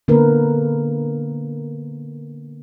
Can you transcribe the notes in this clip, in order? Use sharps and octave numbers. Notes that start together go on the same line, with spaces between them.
D3 A#3 B3 A#4 B4